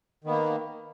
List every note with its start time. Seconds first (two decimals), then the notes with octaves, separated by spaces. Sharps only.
0.24 D#3
0.27 B3
0.29 A#3